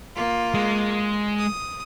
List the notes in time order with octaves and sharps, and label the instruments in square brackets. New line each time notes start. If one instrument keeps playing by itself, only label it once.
[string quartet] A#3 F4
[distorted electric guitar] G#3
[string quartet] D#6